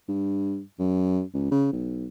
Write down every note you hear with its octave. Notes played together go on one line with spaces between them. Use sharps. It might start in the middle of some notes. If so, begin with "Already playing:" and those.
G2
F#2
C#2
C#3
B1